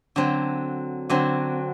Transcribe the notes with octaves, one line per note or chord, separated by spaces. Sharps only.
D3 F#3 C4
D3 F#3 C4